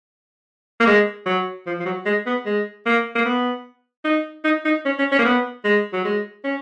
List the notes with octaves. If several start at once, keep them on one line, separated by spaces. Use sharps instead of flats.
A#3
G#3
F#3
F3
F3
F#3
G#3
B3
G#3
A#3
A#3
B3
D#4
D#4
D#4
C#4
C#4
C#4
A#3
B3
G#3
F#3
G#3
C#4